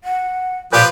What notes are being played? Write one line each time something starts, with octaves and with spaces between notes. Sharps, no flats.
F#5
A#2 F3 G4 B4 F5